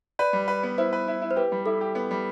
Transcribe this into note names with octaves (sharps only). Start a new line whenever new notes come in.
B4 D5
G3
B4
B3
E4 C5
B4
E4
E4
C5
G4 B4
G3
E4 A4
G4
B3
G3